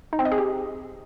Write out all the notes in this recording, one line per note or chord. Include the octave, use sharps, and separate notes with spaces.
D#4
C4
D#5
G#4
G4